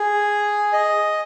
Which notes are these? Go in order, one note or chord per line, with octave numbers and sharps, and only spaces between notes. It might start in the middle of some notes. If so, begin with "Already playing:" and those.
Already playing: G#4
D#5